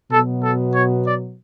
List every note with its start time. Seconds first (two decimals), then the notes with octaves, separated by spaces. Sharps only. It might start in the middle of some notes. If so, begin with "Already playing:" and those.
0.10 B2 F#3 B3 A4
0.42 A4
0.73 C#5
1.05 D5